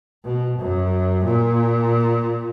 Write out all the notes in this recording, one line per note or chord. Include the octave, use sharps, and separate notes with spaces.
B2
F#2
A#2